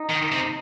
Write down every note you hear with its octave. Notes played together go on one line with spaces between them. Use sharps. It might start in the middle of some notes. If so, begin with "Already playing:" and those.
Already playing: D#4
D#3
C3